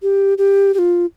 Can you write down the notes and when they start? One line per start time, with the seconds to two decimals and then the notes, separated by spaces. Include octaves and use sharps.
0.02 G4
0.38 G4
0.74 G4
0.78 F4